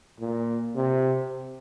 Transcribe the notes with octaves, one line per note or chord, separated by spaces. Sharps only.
A#2
C3